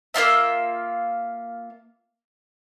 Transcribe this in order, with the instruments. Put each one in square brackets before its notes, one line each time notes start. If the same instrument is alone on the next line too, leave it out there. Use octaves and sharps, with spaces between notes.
[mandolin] A#3 D#4 F4 E5